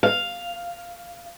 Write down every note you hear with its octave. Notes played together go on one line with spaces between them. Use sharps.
F5